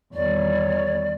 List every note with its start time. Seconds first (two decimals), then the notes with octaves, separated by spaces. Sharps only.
0.14 E2 D#3 G3 C#5 D5